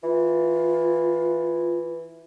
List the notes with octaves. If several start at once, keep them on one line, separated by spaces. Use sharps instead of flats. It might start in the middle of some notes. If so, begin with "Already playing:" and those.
E3 F4